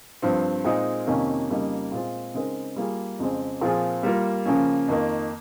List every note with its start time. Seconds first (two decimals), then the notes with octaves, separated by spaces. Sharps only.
0.22 G2 F3 C4
0.64 A#2 G#3 C4 D#4 G#4
1.07 F2 C3 D#3 A#3 C#4
1.49 F2 C#3 G3 A#3 D#4
1.92 A#2 G#3 C4 F4
2.34 C#3 G#3 C4 D#4 A#4
2.76 G3 A#3 F4 G#4
3.19 F2 C#3 G#3 C4
3.61 A#2 F3 C4 F4 G#4
4.03 G3 A#3 F4 A#4
4.46 C#3 F3 A#3 C#4
4.88 F2 D#3 A#3